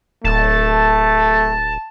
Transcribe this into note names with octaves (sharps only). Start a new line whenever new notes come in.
D1 A3 A5